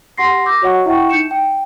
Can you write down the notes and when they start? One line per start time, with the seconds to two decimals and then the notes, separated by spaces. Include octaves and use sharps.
0.18 G4 F#5 C6 A#6 C7
0.46 D6 E6 G6 A#6
0.62 F#4 C#5 D#5 F#5 C#6
0.86 E4 E5 F#5 G5 C#6
1.09 D#4 G6 C#7 E7
1.31 G5